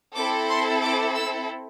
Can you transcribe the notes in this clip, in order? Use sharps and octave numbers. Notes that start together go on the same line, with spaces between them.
C4 E4 A4 D6
C6
D6
E6